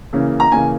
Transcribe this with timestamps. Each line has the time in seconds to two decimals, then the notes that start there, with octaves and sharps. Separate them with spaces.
0.13 C#3 E3 A#3 C#4
0.40 A#5
0.52 C#3 E3 A#3 C#4 G#5